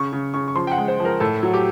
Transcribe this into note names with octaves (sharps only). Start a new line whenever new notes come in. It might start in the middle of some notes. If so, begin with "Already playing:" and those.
Already playing: C#3 C#6
C#3
C#3 C#6
C#6
F3 C6
G5
F#5
G#3
C5
F3
A#4
A2 A4
F#3
G4